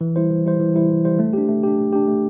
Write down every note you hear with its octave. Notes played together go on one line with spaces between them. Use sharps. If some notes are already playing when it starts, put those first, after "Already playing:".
E3
G3 E4 C5
E3
G3 E4 C5
E3
G3 E4 C5
E3
G3 E4 C5
A3
D4 G4
A3
D4 G4
A3
D4 G4
A3